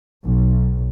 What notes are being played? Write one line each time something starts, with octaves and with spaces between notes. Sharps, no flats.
B1